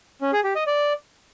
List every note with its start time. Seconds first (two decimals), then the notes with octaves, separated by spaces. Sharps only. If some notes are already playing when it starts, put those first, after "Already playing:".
0.21 C#4
0.33 G#4
0.44 G4
0.55 D#5
0.67 D5